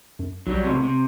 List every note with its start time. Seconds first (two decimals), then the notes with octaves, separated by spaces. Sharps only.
0.19 F#2
0.47 B1 F#3 G3
0.64 C#2 A2 C3
0.84 C3